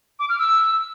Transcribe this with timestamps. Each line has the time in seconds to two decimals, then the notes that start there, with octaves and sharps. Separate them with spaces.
0.19 D6
0.29 F6
0.39 E6